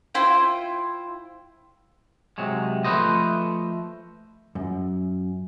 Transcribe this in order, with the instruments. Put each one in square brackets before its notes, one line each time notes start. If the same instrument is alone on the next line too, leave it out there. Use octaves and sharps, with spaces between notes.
[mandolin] E4 F4 C5 G5
[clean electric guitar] C3 F#3 G#3
F3 A3 A#3 B4 C5 D#5
[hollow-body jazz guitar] F#2